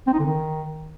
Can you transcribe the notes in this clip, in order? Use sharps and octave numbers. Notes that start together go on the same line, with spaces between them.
C4
D#4
D3
D#3